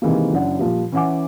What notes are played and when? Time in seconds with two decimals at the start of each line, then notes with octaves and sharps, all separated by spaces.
0.02 C3 D#3 E3 G#3 A#3
0.33 F#1 C#4 D4 F#5
0.59 A#2 F3 G3
0.92 E3 C#4 E5 F#5 G#5 D6